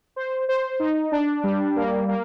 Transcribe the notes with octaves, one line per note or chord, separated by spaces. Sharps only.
C5
C5
D#4
D4
G3
A#3
A#3